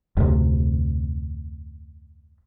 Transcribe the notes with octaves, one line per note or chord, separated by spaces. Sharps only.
F1 D2 A2 C3